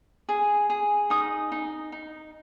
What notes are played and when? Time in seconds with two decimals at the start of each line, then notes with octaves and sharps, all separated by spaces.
0.29 G#4
0.70 G#4
1.10 D#4 D#6
1.52 D#4
1.92 D#4